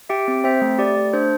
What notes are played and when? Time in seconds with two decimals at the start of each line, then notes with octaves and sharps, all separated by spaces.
0.09 G4 E5 G5
0.28 C4
0.44 C4 C5 E5
0.62 A3
0.79 G4 D5
0.96 A3
1.13 D4 C5